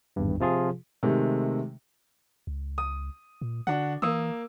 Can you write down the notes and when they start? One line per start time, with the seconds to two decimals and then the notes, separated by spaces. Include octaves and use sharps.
0.16 G#1 E2 G2
0.40 C3 F3 F4 G#4
1.03 C3 D#3 G#3 A3
2.47 C#2
2.78 D#6
3.41 A#2
3.67 D3 D4 F#4 F#5
4.02 E3 A#3 D#6 E6